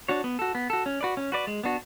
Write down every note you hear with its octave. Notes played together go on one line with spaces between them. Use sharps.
D4 F#4 C#5
B3
F#4 A4
B3
F#4 A4
C#4
F#4 B4 D5
C#4
F#4 B4 D5
G#3
B3 D4 F#4